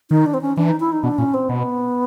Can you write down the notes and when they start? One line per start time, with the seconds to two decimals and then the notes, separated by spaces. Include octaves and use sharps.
0.10 D#3 D#4
0.26 D4
0.34 C4
0.41 C#4
0.57 E3 D4
0.68 D#4
0.80 E4
0.92 D#4
1.03 B2 D4
1.18 A#2 C#4
1.34 C4
1.49 B2 B3